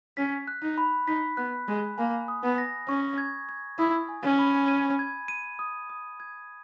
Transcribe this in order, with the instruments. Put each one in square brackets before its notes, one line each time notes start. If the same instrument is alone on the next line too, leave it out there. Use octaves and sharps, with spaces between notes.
[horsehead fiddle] C#4 [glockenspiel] B6
[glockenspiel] F#6
[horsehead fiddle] D#4
[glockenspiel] B5
[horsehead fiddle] D#4 [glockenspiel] B6
[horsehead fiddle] B3 [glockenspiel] F#6
[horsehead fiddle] G#3 [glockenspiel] F#6
[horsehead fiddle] A#3 [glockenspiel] G#5
[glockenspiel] D#6
[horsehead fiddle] B3
[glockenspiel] A#6
[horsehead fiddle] C#4 [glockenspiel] C#6
[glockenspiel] G#6
G#6
[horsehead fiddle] E4 [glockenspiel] D#6
[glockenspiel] G#5
[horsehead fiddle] C#4
[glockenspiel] B5
D#7
G#6
D#7
D#6
D#6
G#6